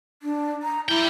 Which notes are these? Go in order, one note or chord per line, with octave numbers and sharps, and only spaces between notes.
D4
A#5
G3 E4 G5